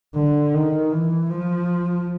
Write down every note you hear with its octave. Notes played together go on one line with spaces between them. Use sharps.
D3
D#3
E3
F3